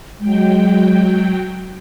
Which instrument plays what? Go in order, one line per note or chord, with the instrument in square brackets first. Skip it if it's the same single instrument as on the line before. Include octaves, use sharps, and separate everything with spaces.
[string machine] F#3 G5 [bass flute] G#3